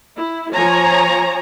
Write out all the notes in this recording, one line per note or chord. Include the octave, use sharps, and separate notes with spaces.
E4
F3 C#5 G#5 A#5